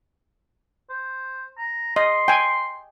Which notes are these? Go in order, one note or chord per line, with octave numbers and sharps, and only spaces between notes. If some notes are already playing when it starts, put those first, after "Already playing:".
C5
A#5
D#5 C6
G5 G#5